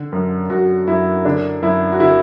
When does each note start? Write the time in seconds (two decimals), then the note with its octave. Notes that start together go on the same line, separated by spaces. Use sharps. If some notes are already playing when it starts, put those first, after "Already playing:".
Already playing: D3
0.12 F#2
0.50 F#2 F#4
0.87 F#2 E4
1.25 D3 D4
1.62 F#2 E4
1.92 F#4
2.00 D3 E4